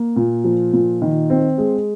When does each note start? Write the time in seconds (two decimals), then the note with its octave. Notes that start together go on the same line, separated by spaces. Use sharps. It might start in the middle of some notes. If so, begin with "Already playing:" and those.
Already playing: A#3
0.16 A#2
0.44 F3
0.73 A#2
1.02 D#3
1.30 C4
1.58 G#3